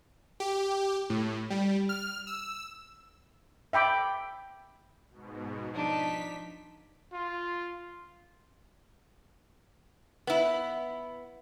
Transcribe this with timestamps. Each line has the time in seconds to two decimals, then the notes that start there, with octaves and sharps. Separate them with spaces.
0.40 G4
1.10 A2
1.50 G3
1.89 F6
2.27 E6
3.73 E5 G5 B5 D6
5.11 G#2 B2
5.74 F3 D4 D#4 B6
7.13 F4
10.27 B3 E4